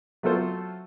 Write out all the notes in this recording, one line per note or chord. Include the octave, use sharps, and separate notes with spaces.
F#3 A3 F4 A4 C5